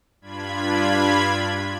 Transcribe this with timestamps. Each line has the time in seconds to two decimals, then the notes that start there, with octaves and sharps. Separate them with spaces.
0.21 G2 D4 F4 B5 G#6